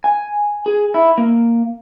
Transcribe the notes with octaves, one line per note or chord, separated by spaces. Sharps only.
G#5
G#4
E4
A#3